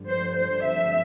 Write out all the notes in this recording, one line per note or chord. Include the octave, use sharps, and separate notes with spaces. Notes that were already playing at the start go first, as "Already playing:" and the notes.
Already playing: G2 D3 F3
C5
C5
E5